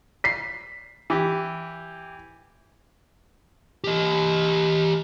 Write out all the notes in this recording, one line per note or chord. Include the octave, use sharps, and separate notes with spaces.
B6 C7
E3 G4
G4 D#5